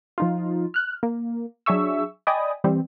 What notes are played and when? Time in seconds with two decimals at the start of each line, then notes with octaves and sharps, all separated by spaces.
0.18 F3 D#4 F4
0.74 F6 F#6
1.03 A#3
1.66 F#3 D4 G#4 E5 C#6 E6
2.27 D5 D#5 G5 G#5 B5 D#6
2.64 E3 G3 C4